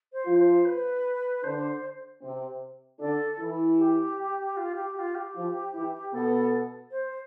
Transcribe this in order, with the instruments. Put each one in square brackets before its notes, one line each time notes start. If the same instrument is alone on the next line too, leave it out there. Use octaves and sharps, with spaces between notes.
[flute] C5
[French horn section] F3 F4
[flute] C5
B4
[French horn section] D3 D4 [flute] C5
[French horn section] C3 C4
[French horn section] D3 D4 [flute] A4
[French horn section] E3 E4
[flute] G4
F4
G4
G4
F4
G4
[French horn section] F3 F4
E3 E4
[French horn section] B2 B3 [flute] A4
[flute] C5